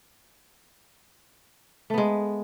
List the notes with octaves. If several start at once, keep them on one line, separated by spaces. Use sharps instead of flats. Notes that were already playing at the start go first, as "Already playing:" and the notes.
G#3 A3 B3